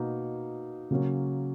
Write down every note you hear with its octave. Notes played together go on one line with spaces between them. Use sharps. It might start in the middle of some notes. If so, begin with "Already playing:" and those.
Already playing: B2 A#3 D#4
C#3 F#3 A#3 C#4